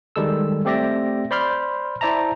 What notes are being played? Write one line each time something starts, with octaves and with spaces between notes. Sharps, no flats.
D#3 G3 G#3 A4 E6
A3 C4 G4 D5 E5 A#6
C5 D5 B5 C6 F6 G6
E4 C5 D5 E5 A5 A#5